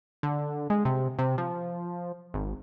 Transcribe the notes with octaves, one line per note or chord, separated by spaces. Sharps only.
D3
G#3
C3
C3
F3
G#1